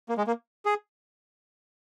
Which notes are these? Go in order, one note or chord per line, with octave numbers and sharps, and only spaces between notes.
A#3
G#3
A#3
G#4